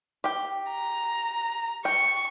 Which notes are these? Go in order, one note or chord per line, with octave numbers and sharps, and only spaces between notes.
G4 G5
A#5
G5 C#6